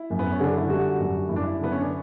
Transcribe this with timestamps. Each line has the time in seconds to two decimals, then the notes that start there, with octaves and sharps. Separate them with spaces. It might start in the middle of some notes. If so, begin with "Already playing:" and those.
Already playing: E4
0.10 F#2
0.19 B3
0.32 C#4
0.40 D3 D4
0.57 E4
0.69 G3 F#4
0.99 F#2
1.29 F#2 E4
1.36 D4
1.43 E4
1.59 D3 B3
1.72 C#4
1.81 D4